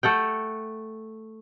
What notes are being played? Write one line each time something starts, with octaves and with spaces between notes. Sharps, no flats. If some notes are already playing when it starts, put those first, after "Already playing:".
A3 A4 F#5 G5